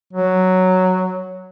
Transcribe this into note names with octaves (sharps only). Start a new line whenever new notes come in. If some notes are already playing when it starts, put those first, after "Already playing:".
F#3